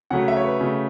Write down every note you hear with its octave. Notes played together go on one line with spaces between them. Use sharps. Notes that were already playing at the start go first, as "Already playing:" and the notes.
C#3 F#3 A3 F#5
E5
C#5
B4
C#3 F#3 A3